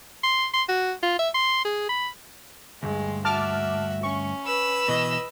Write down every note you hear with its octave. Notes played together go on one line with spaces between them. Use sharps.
C6
C6
F#4
F4
E5
C6
G#4
B5
D2 G2 G#3
F#4 E5 A5 D6 F6
C#4 C#6
B4 E6
B2 E3 D#5